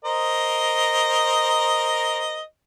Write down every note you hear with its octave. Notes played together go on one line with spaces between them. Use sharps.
A#4 C5 D#5